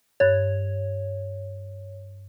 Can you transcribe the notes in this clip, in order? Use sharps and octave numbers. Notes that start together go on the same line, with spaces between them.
G2 C#5 F#6 A6